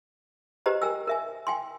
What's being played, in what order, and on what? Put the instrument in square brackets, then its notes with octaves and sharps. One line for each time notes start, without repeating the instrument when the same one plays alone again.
[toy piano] G4 B4 C5 D#5 A#5
A#4 G5 G#5 E6
A#4 E5 G#5
G5 G#5 C6